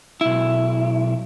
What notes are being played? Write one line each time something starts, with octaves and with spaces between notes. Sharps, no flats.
B1 E4